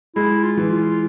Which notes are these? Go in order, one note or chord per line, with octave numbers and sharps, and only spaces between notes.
G#3 E4
F4
E3
F4